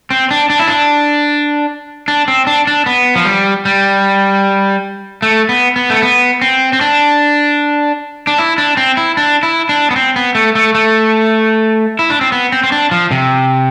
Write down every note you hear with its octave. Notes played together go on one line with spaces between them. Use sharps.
C4
D4
D4
E4
D4
D4
C4
D4
D4
B3
F3
G3
G3
A3
B3
B3
A3
B3
C4
C4
D4
D4
E4
D4
C4
E4
D4
E4
D4
B3
C4
B3
A3
A3
A3
E4
D4
C4
B3
C4
C4
D4
F3
C3